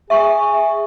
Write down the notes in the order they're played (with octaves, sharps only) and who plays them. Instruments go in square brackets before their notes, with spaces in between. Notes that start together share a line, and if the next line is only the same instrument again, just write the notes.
[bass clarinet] G#4 [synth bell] E5 C#6